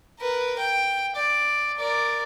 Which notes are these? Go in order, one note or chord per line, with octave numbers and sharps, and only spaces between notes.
A#4 B4
G5
D5
A#4 D5